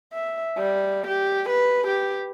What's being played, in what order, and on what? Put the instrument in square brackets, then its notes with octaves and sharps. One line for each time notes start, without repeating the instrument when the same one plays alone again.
[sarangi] E5
G3
G4
B4
G4